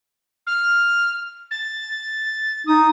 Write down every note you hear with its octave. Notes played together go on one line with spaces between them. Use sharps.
F6
A6
D#4 D#6